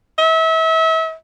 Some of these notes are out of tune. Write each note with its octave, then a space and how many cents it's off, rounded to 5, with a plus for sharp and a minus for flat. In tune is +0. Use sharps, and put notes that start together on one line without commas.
E5 -35